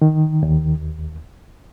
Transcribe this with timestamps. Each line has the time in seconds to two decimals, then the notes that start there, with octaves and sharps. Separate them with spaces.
0.02 D#3
0.43 D#2